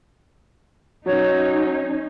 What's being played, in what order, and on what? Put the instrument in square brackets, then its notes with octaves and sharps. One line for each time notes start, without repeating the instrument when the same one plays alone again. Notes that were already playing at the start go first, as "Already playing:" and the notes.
[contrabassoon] F#3 [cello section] C#4 D#4 [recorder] C#5